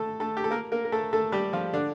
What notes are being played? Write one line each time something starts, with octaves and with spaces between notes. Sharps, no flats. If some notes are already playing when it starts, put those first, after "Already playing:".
Already playing: A3 A4
A3 A4
G4
A4
A#3 A#4
A#3 A#4
A#4
A3 A4
A3 A4
G3 G4
F3 F4
D3 D4